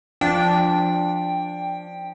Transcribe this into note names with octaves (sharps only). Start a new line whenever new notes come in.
F3 D4 G5